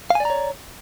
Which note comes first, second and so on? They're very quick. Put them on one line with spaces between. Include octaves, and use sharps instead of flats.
F5 G#5 D5 A#5 C#5